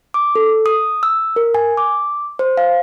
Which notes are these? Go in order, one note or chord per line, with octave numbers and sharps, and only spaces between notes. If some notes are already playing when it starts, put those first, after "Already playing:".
D6
A4
D#6
E6
A#4
G#5
D6
C5
F5